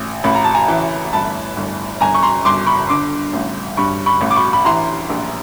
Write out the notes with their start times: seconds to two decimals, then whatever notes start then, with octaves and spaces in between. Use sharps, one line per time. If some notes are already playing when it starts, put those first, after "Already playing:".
Already playing: A1
0.24 A1 B5
0.35 A#5
0.44 A5
0.55 G#5 A#5
0.68 E3
1.13 G1 A5 B5
1.56 G1
2.01 G1 G#5 A#5
2.14 C#6
2.23 A#5 C6
2.45 G1 C6 D6
2.67 B5 C#6
2.89 D3 C6 D6
3.33 A1
3.77 G2 B5 C#6
4.06 B5 C#6
4.21 A1
4.31 D6
4.36 B5 C#6
4.53 B5
4.65 E3 A#5 C6
5.10 A#1